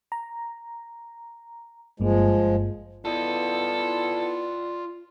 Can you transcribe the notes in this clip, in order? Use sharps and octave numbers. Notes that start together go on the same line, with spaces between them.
A#5
G1 G2 F3 G#3 A#3
B3 E4 F4 A4 D5 D#5